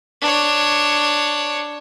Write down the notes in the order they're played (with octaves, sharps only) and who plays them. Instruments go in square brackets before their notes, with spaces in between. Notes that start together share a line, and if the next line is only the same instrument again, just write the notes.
[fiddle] D4 C#5